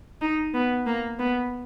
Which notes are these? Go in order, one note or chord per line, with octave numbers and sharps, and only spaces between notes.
D#4
B3
A#3
B3